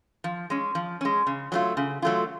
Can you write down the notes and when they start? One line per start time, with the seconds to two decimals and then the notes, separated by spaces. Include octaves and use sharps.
0.24 F3
0.50 G#3 C#4
0.75 F3
1.01 G#3 C#4
1.27 C#3
1.52 F#3 A3 F4
1.77 C#3
2.02 F#3 A3 F4